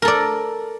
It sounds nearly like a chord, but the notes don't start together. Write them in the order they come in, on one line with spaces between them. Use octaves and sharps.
A#4 A4 D5